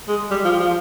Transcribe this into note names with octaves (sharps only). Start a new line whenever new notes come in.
G#3
G3
F3
F3